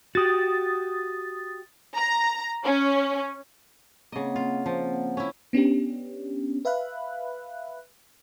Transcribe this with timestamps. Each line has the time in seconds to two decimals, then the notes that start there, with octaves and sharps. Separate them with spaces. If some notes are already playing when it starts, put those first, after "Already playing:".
0.15 F#4 G4 D#6 A6
1.96 A#5
2.64 C#4
4.12 C#3 A#3 C4 D#5 F#5
4.36 F4
4.66 F3
5.17 C#4 E4
5.53 B3 C#4 D4 G4
6.65 B4 E5 F5 B5 F#6